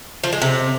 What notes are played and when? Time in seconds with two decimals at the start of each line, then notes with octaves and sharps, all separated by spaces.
0.24 F3
0.33 G#3
0.42 C3